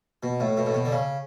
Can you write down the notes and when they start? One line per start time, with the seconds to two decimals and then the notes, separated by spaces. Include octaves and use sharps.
0.23 B2
0.40 A2
0.57 B2
0.66 A2
0.74 B2
0.85 D3
0.92 C#3